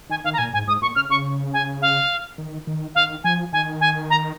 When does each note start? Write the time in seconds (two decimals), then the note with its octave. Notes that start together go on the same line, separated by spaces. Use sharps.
0.10 D#3 G#5
0.24 D#3 F5
0.33 A#5
0.38 A#2 G#5
0.53 G#2 G#5
0.67 G#2 D#6
0.81 A#2 C#6
0.95 C#3 F6
1.10 C#3 C#6
1.53 G#5
1.82 F5
2.38 D#3
2.67 D#3
2.95 D#3 F5
3.24 F3 G#5
3.52 D#3 G#5
3.81 G#5
4.10 A#5